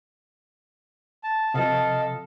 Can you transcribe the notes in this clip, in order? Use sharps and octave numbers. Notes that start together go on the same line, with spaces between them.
A5
C3 F3 A4 D#5 F5